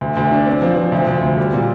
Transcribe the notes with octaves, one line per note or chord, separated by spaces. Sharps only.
D2
D2
D4
C4
F3
F3
D2
D2
D2
G3
A#2